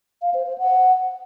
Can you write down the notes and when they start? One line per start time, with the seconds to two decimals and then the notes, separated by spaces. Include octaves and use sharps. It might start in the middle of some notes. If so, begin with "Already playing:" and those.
0.22 F5
0.34 C5
0.46 C5
0.58 F#5